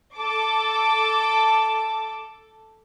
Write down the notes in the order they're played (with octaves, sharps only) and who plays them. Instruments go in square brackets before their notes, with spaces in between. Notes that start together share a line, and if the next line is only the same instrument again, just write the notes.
[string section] A4 D6